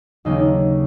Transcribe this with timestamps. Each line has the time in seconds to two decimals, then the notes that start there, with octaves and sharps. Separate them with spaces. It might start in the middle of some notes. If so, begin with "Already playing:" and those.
0.25 D#2 C#3 F#3 A#3 D#4
0.33 D4
0.41 D#4